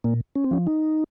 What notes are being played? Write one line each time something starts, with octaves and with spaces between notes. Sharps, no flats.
A#2 A#3
C#4
C4
F3 C#4
D#4